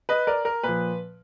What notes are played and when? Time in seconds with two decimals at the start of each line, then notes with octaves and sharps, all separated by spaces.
0.09 B4 D#5
0.27 A#4 D5
0.45 A#4
0.64 A#2 F3 B4